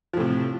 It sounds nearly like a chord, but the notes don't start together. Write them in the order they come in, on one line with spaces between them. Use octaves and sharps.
F3 A2 C3